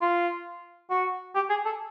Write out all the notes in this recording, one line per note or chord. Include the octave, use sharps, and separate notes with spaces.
F4
F#4
G4
G#4
A4